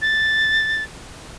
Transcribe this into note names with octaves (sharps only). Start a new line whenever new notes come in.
A6